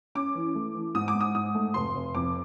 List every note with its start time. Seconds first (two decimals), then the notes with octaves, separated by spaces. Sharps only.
0.15 C#4 D6
0.35 E3
0.55 A3
0.74 E3
0.94 G#2 D#6
1.08 D6
1.14 G#2
1.21 D#6
1.35 G#2 D#6
1.54 A3
1.74 F1 C6
1.95 F1
2.15 F2 D6